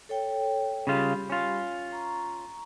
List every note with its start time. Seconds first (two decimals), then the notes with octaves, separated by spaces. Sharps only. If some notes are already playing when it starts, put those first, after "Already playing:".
0.09 A4 C#5 G5
0.87 C#3 G3 F4 G4 B5
1.30 C#4 F4
1.92 A#5 C#6